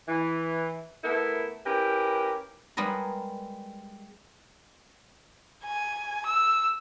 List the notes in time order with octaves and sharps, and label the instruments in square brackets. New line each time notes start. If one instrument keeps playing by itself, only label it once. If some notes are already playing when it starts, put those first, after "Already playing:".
[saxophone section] E3
A3 B3 E4 A#4
C#4 E4 G4 A#4 B4
[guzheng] G3 G#3 B3 A#4
[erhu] G#5
E6